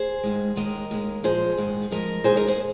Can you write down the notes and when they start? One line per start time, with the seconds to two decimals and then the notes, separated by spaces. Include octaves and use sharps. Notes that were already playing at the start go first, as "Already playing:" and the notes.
Already playing: G#4 C5
0.23 G#2 D#3 G#3
0.56 D#2 D#3 G#3 A#4 D#5
0.91 D#2 D#3 G#3
1.24 A#2 F3 G#3 G#4 C5
1.58 G#2 D#3 G#3
1.91 F2 F3 G#3 A#4 D#5
2.24 D#2 D#3 G#3 G#4 C5
2.37 A#4 D#5
2.47 G#4 C5